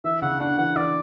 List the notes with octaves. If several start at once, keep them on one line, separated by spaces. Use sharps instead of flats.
E3 E5
C#3 F#5
D4 F#5
E3 F#5
E3 D5